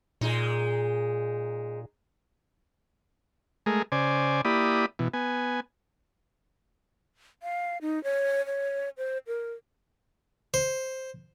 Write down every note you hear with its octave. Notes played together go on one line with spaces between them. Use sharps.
A#2 G#3 D#4
G#3 A3 G#4 A#4
C#3 C5 D5 G#5
A#3 E4 G4 D5 B5 D#6
B2 E3
B3 G#5
F5
D#4
C#5
C#5
C5
A#4
C5